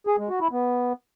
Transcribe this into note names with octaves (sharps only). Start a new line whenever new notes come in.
G#4
G#3
F#4
E4
B3